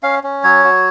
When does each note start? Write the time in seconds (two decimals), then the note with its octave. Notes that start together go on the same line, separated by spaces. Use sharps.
0.03 C#4 F5
0.23 C#4
0.43 F#3 C#5
0.63 F#4